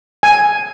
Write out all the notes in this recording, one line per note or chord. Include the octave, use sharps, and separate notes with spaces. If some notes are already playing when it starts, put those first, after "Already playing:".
G#5